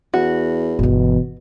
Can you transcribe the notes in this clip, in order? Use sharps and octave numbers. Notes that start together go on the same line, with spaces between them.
E2 F#4
G1 B2 E3